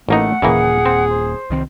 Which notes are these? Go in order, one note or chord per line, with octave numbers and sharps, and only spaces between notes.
A1 A3 A#3 D#4 F#5
D#1 A#2 C#3 E3 A#3 G#4
C4
C5
C2 D#3 C4